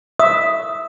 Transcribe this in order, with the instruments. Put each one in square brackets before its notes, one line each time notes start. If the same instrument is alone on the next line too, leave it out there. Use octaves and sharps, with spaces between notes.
[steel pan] E5 [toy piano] D#6